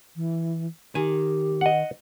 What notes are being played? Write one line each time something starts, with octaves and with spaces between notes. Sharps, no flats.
E3
D#3 G4 G#5
D#5 F#5